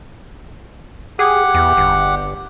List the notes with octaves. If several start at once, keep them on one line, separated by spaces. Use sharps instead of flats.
G4 G#4 F#5
E2
G1